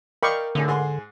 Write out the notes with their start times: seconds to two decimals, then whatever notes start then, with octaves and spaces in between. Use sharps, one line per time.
0.23 A#4 D5 D#5 F5 G5 B5 C#6
0.55 A2 D3 D4 G#4
0.68 G#2 G#4 C6